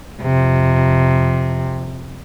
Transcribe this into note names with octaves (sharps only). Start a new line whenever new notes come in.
F2 C3